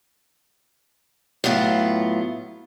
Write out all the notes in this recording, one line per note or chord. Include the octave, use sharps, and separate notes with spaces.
A2 F#3 B3 F4